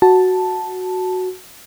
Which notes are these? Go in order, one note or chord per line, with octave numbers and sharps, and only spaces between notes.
F#4 A5